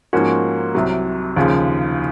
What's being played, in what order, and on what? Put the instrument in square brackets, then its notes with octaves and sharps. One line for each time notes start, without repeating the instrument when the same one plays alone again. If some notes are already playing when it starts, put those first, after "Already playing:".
[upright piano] G#2 F3 A#3 C#4 F#4
C2 C3 F#3
D#2 C#3 F3